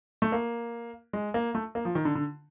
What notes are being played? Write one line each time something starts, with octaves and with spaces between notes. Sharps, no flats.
A3
A#3
G#3
A#3
A3
A#3
F3
D#3
D3
D3